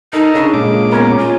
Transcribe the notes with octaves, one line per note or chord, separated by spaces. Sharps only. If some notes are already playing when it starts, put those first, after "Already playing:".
D#4 A4 A#4 D#5
C#3 D4
A#2 G#3 D6
B3 C#4 A#4
F4